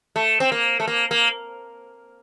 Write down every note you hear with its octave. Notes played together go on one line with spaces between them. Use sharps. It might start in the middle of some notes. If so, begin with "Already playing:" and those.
A3
C4
A#3
A3
A#3
A#3